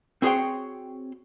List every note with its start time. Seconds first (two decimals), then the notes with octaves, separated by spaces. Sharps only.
0.22 C4 F#4 G#4 C5 C#5 G5